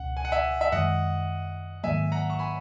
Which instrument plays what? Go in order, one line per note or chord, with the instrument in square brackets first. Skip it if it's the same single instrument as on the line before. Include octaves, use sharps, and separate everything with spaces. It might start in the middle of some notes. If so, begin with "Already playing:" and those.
Already playing: [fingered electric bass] C#2 B2 C#4 [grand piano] F#5
[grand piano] G#5
F#5
E5 G#5
E5
[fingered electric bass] F#2 D#3 G#3 [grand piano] D#5 F#5
[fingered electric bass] G#2 D#3 F#3 A#3 [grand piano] E5 G#5
[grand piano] F#5 A#5
C#6
G#5 B5